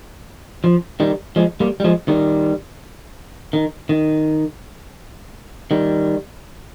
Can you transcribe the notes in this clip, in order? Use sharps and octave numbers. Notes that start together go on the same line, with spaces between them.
F3
D#3 G3
F3 G#3
G3 A#3
G3
F3 G#3
D#3 G3
D#3
D#3
D#3 G3